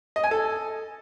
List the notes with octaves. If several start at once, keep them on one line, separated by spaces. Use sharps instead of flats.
D#5
G#5
A4